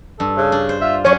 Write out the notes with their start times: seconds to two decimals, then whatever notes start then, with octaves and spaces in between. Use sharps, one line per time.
0.20 G2 A4
0.37 C#3
0.52 D4
0.69 C5
0.81 F4 E5
1.05 F#3 C#4 D4 C#5